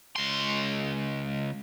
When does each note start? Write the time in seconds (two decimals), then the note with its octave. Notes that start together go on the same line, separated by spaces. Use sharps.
0.16 C#2 C6